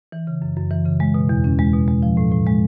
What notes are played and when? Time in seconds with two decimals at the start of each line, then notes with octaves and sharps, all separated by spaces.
0.12 E3
0.27 C#3
0.42 F#2
0.57 F#2
0.71 E3
0.86 C#3
1.00 G#3
1.14 B2
1.29 E2
1.44 C#4
1.59 G#3
1.74 B2
1.88 G#3
2.03 F3
2.17 A2
2.32 A2
2.47 G#3